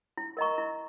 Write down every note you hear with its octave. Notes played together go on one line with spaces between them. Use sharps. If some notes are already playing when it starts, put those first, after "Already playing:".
E4
A#4 D#5 A#5 C#6
E4